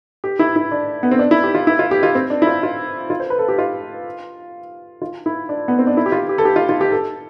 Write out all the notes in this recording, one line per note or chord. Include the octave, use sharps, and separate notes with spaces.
G4
E4
E4
D4
B3
C4
D4
E4
G4
F4
E4
F4
G4
F4
C4
D4
E4
F4
F4
F4
C5
B4
A4
G4
F4
F4
E4
D4
B3
C4
D4
E4
G4
F4
G4
A4
G4
F4
F4
G4
A4